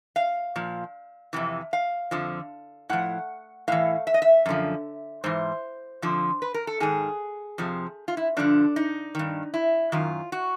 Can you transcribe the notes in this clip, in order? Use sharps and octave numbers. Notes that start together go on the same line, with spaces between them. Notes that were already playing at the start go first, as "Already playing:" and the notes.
F5
A#2 F3
F2 C3 E3
F5
F2 D3 F3
A2 F3 F#5
A2 E3 F5
E5
D#5
E5
F#2 D3 F3
G#2 E3 C5
F2 D3 F3
B4
A#4
A4
G#2 D#3 G#4
F2 C3 F3
F4
E4
G2 D3 F3 D4
D#4
G2 D#3
E4
F#2 D#3 F4
F#4